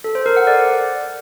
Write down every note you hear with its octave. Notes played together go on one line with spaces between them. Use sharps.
A4
C5
A#4
F#5
D5